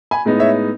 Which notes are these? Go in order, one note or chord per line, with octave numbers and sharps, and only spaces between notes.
G#5 B5
A2 G#3 B3 D#4
C#5 E5